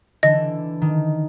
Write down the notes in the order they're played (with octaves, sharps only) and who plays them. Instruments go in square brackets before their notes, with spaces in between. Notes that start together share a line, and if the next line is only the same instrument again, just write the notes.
[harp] D3 E3 D4 [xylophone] D#5
[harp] D#3